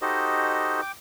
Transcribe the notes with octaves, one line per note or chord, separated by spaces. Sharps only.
D#4 F#4 G4 A4 C5 D#5
G5 D6